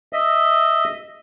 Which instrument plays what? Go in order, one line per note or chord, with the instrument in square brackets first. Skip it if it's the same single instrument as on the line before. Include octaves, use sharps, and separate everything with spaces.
[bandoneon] D#5 E5